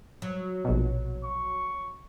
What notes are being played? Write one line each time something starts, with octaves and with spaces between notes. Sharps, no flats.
F#3
A#1 B2
C#6